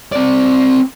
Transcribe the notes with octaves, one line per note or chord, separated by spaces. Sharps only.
C4 D5